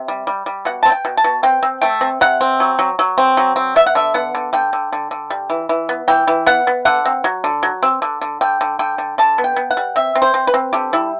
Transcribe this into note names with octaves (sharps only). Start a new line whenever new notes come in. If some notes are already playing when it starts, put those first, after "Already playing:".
Already playing: C3
G3
G3
G3
B2 F#5
C4 A5
G5
B2
A5
B2
C4 G5
C4
A3 G5
C4
C3 F#5
C4
F#3
F#3
F#3
C4
F#3
C4
B3 E5
F#5
D3 E5
B3 F#5
D3
D3 G5
D3
D3
D3
G3
E3
E3
B3
E3 G5
E3
B3 F#5
B3
D3 F#5
C4
F#3
D3
F#3
C4
D3
D3
D3 G5
D3
D3 G5
D3
D3 A5
B3
G5
B3
F#5
G3
C4 E5
C4
C5
C4
B4
C4
D3 G4
G3 E4